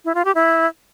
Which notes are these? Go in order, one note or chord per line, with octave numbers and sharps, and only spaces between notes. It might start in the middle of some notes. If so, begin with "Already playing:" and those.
E4
F4
G4
E4